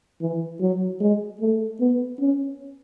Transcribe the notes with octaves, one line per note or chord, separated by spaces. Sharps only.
E3
F#3
G#3
A3
B3
C#4